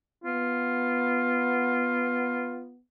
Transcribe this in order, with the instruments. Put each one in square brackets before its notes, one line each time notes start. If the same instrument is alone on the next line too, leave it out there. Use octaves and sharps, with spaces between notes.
[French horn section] B3 [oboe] F4